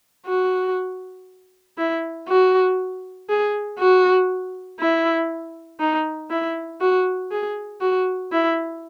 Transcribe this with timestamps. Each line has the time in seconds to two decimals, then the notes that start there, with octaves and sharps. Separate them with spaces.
0.26 F#4
1.78 E4
2.28 F#4
3.29 G#4
3.79 F#4
4.80 E4
5.80 D#4
6.31 E4
6.81 F#4
7.31 G#4
7.81 F#4
8.32 E4